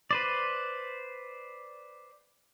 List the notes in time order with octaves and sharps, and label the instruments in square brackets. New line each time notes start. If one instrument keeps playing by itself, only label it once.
[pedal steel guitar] B4 C5 D5